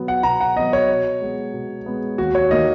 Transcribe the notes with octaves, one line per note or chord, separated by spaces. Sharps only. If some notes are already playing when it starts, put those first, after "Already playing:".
Already playing: B2 F#3 B3
F#5
B2 A#5
F#5
F#3 B3 D#5
C#5
B2
G#3 B3
B2
G#3 B3
D#2 F#4
C#5
D#3 A#3 D#5